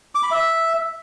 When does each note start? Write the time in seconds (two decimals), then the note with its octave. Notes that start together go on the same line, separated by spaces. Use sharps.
0.15 D6
0.23 B5
0.31 E5